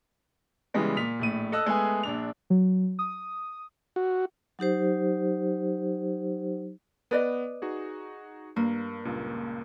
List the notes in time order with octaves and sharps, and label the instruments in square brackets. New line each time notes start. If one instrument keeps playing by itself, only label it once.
[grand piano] C#3 E3 G3 G#3 B3
A#2 B6 F7
A#1 A2 D#7
A4 D#5 E6 F#6
G#3 A3 B3 G#4 G#5
A#1 D4 F7
[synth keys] F#3
D#6
[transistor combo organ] F#4
[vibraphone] F#3 D#4 G4 C5
[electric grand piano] B3 [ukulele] B4 D5 D#5
[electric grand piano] D#4 F#4 G#4
[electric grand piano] G2 [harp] A#3
[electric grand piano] C#2 G2 A#2